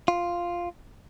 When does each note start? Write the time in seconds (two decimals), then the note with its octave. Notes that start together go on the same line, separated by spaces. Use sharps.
0.08 F4